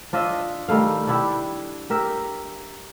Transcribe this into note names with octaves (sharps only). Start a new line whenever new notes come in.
D4 F4 D#5 E5
D#3 G3 A3 F5
D4 E4 G4
G4 A#4 E5